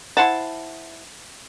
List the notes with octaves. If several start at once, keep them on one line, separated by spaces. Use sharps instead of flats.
E4 C5 F#5 A5